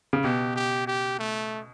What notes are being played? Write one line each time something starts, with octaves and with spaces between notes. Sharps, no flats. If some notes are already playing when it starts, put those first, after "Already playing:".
C#3
B2 G4
G4
G4
A3